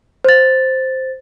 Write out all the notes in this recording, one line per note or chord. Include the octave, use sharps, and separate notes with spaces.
C5 A6